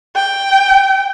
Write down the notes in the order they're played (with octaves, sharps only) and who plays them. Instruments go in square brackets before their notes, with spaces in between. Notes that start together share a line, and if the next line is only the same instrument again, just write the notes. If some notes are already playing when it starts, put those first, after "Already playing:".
[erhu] G5